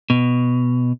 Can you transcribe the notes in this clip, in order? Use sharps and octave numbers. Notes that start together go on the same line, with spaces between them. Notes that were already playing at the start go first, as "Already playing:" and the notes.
B2